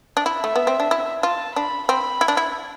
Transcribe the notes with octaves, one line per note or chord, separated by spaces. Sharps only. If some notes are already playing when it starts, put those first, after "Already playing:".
D4
E4 E5
A3
B3
C4
D4
E4
F4 A5
D4 B5
C4 B5
E4
D4
E4